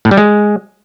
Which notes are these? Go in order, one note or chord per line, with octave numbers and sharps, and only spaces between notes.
A2
G3
G#3